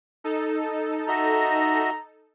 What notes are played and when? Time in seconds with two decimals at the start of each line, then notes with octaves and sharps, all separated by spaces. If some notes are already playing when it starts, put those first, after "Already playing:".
0.24 D#4 A4
1.08 F#4 D#5 E5 A#5